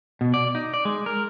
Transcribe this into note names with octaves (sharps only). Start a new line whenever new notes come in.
B2
D5
D#4
D5
G#3
A#4